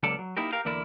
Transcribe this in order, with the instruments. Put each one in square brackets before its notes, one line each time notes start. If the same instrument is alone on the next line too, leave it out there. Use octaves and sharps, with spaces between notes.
[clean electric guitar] C#2 F#3 A#3 C#4 A4 D5
F#3
A#3 D#4 E4 G4 A#4
G4 A#4 F5
E2 D3 A#3 E4 A#4 D5